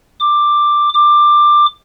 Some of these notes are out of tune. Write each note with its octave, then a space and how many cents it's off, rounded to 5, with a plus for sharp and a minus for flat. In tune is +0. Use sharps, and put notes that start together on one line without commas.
D6 +10
D6 +15